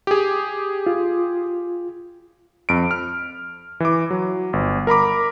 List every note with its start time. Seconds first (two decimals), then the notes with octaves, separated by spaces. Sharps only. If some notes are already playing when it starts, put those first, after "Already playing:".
0.07 G4 G#4
0.87 F4
2.69 F2 D7
2.91 F6
3.80 E3 D6
4.11 F#3
4.53 G1
4.87 A#4 A#5 B5 D6